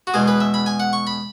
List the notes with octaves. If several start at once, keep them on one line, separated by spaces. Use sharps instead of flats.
F#4
E2 B2 G#3 G#4
B4
E5
B5
G#5
F#5
C#6
B5